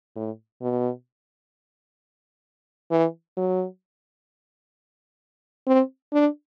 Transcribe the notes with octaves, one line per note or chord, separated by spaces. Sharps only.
A2
B2
E3
F#3
C4
D4